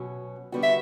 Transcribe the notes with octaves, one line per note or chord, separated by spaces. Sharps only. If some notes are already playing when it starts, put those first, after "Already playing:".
Already playing: B2 F#3 C#4
D3 G3 B3 F#4
E5